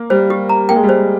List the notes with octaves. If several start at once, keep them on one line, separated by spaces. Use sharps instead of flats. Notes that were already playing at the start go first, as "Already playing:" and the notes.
Already playing: A#3
G3 C5
G4
A#5
A#3 G5
G#3
G3
G#3 C5